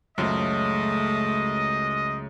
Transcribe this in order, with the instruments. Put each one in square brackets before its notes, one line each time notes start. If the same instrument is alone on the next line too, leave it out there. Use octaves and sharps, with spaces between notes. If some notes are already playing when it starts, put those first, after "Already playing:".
[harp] C#2 [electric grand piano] F#2 [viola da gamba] A3 [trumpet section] D#5